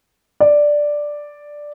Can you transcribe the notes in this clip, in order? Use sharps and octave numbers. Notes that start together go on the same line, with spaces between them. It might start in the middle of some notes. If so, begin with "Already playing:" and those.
D5